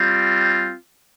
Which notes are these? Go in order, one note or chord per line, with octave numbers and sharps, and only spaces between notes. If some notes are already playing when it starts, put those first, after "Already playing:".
Already playing: G3 C4 F4